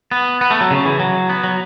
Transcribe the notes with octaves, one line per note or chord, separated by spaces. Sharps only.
B3
B3
A3
F#3
C#3
E3
F#3
B3
F#3